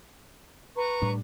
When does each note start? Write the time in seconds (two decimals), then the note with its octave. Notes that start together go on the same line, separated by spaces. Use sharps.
0.77 B4 A#5 C#6
1.02 A2 G3 D4